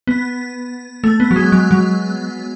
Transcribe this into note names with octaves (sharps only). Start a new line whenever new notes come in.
B3
A3
B3
F#3
G#3
F#3
F#3